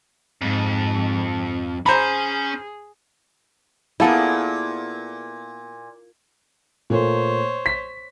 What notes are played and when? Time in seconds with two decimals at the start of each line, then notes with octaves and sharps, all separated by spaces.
0.41 F2 G#2
1.86 C#4 G#4 C5 G#5 A#5 B5
4.00 A#2 A#3 B3 E4 G#4 A4
6.90 A#2 A3 A#3 C5 C#5
7.66 B6